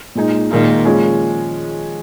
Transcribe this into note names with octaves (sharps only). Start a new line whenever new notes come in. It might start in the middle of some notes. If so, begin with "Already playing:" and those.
A#2 G#3 D#4
A#2 D#3 G#3 D#4
F3 G#3 C#4